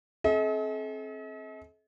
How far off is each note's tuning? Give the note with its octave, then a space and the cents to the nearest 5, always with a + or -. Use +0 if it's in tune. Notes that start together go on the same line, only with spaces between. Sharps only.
C4 +30 A4 -45 D#5 +45